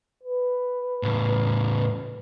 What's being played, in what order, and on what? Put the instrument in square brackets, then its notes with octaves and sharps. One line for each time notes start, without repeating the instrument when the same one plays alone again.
[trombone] B4
[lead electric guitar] A2 C#3